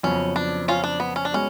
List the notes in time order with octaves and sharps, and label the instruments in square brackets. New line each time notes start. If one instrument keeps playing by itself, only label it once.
[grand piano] F2 C#3 F#3 B3 F4 [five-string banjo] C#4
[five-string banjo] D4
C#4 F4
D4
B3
C#4
D4
[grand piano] G#3 B3 F#4 [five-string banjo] C#4